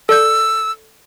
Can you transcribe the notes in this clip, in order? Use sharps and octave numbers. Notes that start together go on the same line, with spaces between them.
A4 D5 E6 G6